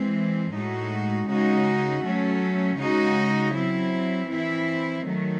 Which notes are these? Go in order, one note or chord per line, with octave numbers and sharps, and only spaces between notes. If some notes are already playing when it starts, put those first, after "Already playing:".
Already playing: E3 G#3 C4
A2 G#3 D#4 F#4
C#3 G#3 D#4 F#4
F#3 A3 C#4
C#3 G#3 D#4 F#4
F#3 C4 E4
E3 C4 E4
D#3 F#3 A3